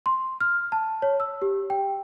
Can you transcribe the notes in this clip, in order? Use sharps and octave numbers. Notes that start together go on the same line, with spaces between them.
C6
F6
A5
C#5
E6
G4
G5